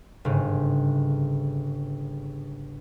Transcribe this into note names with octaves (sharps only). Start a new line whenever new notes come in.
G1 G#2 C#3